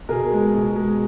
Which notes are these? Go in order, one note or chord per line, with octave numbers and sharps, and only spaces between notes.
B2 G#4 A#4
G#3
B2
G#3